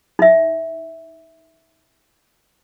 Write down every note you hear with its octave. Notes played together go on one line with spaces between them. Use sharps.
D#4 E5